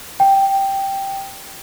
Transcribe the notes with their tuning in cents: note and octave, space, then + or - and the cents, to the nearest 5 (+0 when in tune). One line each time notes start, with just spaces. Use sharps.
G5 +0